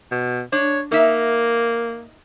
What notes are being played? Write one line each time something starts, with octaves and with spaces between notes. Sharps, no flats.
B2
D4 C#5
A#3 D#4 E5